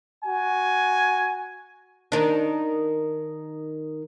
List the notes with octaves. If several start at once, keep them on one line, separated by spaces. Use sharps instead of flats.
F#4 G#5
D#3 D4